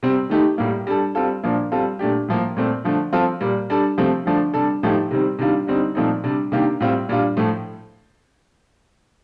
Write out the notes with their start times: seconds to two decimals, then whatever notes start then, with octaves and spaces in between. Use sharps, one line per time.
0.03 C3 G3 C4
0.30 D#3 A3 D#4 G4
0.58 A2 G3 A#3
0.87 G3 D4 A4
1.15 G3 C4 F4 A4
1.44 A#2 F3 A#3 D4
1.72 G3 C4 F4 A4
1.99 A#2 A3 D4 G4
2.28 A2 F3 A#3
2.57 A#2 A3 C4
2.85 D3 F3 A3
3.13 F3 C4 F4 A4
3.41 A#2 G3 A#3
3.70 G3 D4 A4
3.97 C3 F3 A3 C4
4.26 D3 F3 A3 D4
4.54 C3 G3 D4 A4
4.83 A2 F3 A3 D#4 G4
5.11 C3 D#3 G3 C4
5.39 C3 D#3 G3 D4 F4
5.67 D3 G3 C4 D#4
5.95 A#2 F3 A3 C4 D#4
6.24 C3 G3 D4
6.52 C3 D#3 A#3 D4 G4
6.80 A2 G3 C4 F4
7.09 A#2 G3 D4 F4
7.37 A2 F3 A3